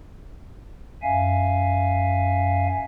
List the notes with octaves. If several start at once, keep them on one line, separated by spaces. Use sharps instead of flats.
F#2 E5 F5 G#5